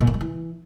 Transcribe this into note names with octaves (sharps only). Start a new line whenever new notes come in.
A#2
D3
F#3
E3